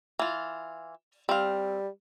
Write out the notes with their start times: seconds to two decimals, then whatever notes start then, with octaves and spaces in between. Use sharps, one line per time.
0.19 E3 F4
1.29 G3 C4 F5